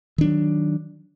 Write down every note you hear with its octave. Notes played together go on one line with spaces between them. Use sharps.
D#3 F#3 D4